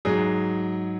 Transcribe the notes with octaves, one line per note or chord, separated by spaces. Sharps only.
G#2 F#3 G#4